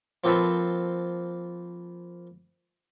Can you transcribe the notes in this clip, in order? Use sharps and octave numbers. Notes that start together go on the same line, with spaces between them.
F3 A#3 C4 F4 A4 B4